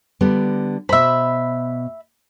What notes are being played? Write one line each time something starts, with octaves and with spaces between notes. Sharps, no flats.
D3 G3 B3
B2 C5 E5 B5